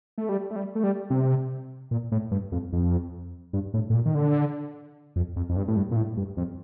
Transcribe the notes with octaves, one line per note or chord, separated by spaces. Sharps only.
A3
G3
A3
G3
A3
G3
C3
A#2
A2
G2
F2
F2
G2
A2
A2
A#2
D#3
D3
F2
F2
F2
G2
A2
G2
A#2
A2
G2
F2